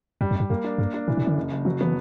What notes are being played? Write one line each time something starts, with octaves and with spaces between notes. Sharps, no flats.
F#2 G3
F#2
G2 G3
F#2 A#3
D4
G2 A#3
D4
A#2 E3
B2
F#2
D3
F#1
F#1
E3 F#3
E3 B3